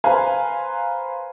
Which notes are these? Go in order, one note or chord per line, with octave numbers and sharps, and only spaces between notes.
B4 C5 F5 G#5 A#5